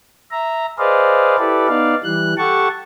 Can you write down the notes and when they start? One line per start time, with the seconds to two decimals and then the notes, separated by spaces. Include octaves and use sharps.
0.31 E5 A#5
0.78 G#4 B4 C5 D5 D#5 F5
1.38 E4 G4 A4 B4 D5
1.68 B3 D#4 D5 F5
2.04 E3 G3 F#6
2.38 G4 A4 F#5 A5 C#6